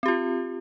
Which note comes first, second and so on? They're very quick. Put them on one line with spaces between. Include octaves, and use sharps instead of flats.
C4 G4 F4